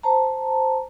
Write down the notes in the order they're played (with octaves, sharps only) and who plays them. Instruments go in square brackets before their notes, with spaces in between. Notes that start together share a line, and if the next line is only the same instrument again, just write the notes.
[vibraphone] C5 A5 A#5